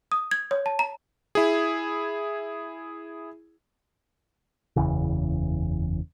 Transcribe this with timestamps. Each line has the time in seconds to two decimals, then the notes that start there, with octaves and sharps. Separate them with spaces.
0.12 D#6
0.31 G#6
0.51 C#5
0.66 A5
0.79 A#5
1.35 E4 G#4
4.76 F#1 E2 C#3 E3